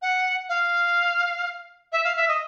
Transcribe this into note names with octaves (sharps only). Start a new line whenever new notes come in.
F#5
F5
E5
F5
E5
D#5